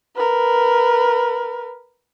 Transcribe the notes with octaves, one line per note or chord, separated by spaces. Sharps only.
A#4 B4